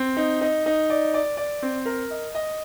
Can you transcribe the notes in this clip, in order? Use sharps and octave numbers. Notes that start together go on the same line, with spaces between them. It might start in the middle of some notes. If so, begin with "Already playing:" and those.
Already playing: C4
D#4
D#4
D#4
D5
D5
D5
C4
A#4
D#5
D#5